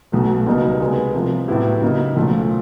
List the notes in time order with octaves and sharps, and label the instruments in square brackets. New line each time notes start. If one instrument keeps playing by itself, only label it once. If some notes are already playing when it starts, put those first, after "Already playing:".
[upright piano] B1 B2 F#3 A3
C#2 B2 G3 A#3 D#4
C2 B2 G#3 B3
C2 C3 F3
A2 F#3 B3 E4 G4
C#3 F#3 A#3 D#4
B1 A#2 F3 A3